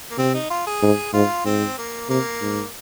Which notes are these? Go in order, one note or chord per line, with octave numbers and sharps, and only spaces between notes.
A#3
C3 C4
D#4
F4
G#4
G#2
G#2 F4
G#2 C4
A#3
C3 A#3
G#2